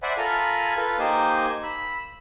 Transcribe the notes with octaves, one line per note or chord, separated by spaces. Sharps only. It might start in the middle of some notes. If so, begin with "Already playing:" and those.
C5 D5 E5 F#5 G#5 B5
F4 A4 A#4 G#5 B5 F6
F4 A4 B4 F5
A#3 D#4 G4 C5 G#5
B5 E6